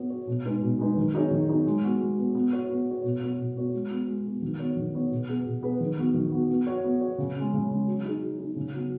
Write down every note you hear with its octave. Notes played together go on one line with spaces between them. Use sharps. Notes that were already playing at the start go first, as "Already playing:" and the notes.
Already playing: B3 F#4 C#5
F#4 C#5
B2
G#3 D#4 B4
B2
G#3 D#4 B4
D#3
F#3 D#4 G#4 C#5
D#3
F#3 D#4 G#4 C#5
G#3
B3 F#4
G#3
B3 F#4
B3
F#4 C#5
B3
F#4 C#5
B2
B3 F#4 C#5
B2
B3 F#4 C#5
G#3
B3 F#4
G#3
B3 F#4
D#3
B3 F#4 C#5
D#3
B3 F#4 C#5
B2
B3 G#4 B4
B2
B3 G#4 B4
D#3
B3 F#4
D#3
B3 F#4
B3
F#4 C#5
B3
F#4 C#5
C#3
G#3 C#4
C#3
G#3 C#4
F#3
D#4 G#4
F#3
D#4 G#4
C#3
F#3 B3 F#4